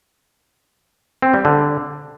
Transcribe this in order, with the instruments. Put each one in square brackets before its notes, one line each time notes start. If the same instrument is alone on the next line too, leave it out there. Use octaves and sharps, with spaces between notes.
[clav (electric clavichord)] C4
G3
D3